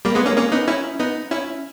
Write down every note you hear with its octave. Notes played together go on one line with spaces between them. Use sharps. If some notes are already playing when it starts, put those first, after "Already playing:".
G3 A#3
G#3 B3
A#3 C#4
A#3 C#4
B3 D#4
C#4 E4
B3 D#4
C#4 E4